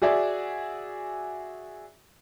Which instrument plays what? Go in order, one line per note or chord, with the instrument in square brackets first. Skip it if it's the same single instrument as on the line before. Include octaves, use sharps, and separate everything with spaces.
[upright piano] F#4 G#4 D5 E5